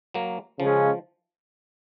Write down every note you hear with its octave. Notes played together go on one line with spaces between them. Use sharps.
F#3 A#3
C#3 F3 G#3 C#4